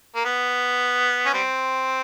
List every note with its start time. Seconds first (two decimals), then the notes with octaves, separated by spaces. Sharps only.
0.16 A#3
0.25 B3
1.26 C#4
1.33 G3 C4